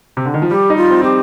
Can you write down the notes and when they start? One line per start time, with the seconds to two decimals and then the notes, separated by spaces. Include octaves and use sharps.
0.17 C3
0.25 D3
0.34 D#3
0.42 F3
0.51 G3 G4
0.70 D#4
0.77 F4
0.90 C4
1.02 C4 G4